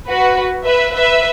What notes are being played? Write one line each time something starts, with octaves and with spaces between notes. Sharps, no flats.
F#4 B4
B4 E5
B4 E5